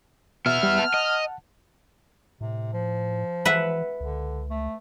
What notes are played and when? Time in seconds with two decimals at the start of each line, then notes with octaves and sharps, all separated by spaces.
0.46 B2 B3 E5 F6
0.63 G3
0.78 F#5 A5
0.94 D#5
2.41 A2 C3
2.73 F3
3.45 E3 B4 E5 F#5
4.00 C#2 D3
4.50 A3